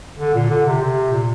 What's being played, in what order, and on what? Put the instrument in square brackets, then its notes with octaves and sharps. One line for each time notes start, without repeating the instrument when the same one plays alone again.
[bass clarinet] D3
A#2
D3
C3
C3
A#2